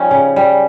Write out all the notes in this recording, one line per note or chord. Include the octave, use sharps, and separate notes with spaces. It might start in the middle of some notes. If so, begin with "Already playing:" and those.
Already playing: F3 G3 C#4 D#4 F4
C#3
G3